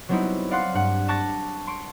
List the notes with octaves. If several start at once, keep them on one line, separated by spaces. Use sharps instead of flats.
F#3 G3 B3 C4 D#4 E4
D5 F5 F#5 C6 F#6 C7
G2 F#5 F#6
A5 C#6 D6 F#6 A6 A#6
C6 C#6 D7